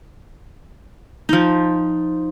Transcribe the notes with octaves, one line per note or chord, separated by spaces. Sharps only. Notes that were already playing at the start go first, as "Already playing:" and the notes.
F3 D#4